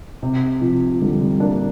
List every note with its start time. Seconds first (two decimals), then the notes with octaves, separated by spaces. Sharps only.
0.23 C3
0.61 C3 F3
0.93 F3
1.01 D3 G3
1.21 G3 C4
1.40 A#3 D4